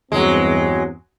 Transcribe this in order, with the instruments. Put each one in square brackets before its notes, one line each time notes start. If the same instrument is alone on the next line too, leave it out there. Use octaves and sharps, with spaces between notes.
[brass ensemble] E2 G2 C4 [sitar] F#3 G#3